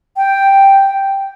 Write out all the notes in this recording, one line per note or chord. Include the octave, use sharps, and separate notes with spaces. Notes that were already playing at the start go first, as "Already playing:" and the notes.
G5